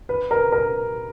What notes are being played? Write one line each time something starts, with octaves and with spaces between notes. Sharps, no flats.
B4
A#4
A#4